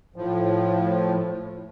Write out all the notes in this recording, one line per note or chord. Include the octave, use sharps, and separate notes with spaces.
A2 F3